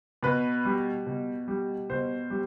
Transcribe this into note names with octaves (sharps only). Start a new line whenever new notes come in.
B2 B4
G3
B2
G3
B2 C5
G3